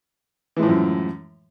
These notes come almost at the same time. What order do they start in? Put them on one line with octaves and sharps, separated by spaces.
E3 G#3 A2 F3 F#2